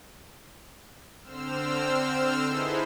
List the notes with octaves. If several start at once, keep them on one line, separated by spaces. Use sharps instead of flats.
D3 C4 C5 E6 F6
D#4 E4 G#4 A4 B4 C5